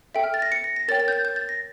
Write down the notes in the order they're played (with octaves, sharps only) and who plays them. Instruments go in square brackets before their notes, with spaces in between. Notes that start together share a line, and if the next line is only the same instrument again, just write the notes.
[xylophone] A4 E5 G5
F6
A6
A#6
C#7
A#6
A#6
A#4 C#5 G5 A6
A6
G6
A6
G6
A6
A#6